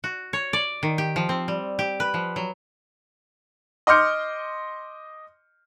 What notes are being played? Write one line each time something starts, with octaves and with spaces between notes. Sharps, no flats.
F#4
C#5
D5
D#3
G4
F3
C4
G3
G4
B4
F3
F#3
D#5 C6 D6 F6 G6 C#7